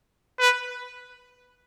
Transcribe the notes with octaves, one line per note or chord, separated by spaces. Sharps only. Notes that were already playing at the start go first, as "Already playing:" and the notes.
B4